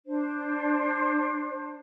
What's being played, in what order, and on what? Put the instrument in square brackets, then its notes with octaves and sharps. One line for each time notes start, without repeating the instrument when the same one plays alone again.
[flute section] D4 C5